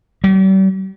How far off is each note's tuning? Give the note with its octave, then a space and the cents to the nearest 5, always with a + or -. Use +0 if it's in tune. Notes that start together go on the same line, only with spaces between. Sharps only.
G3 -40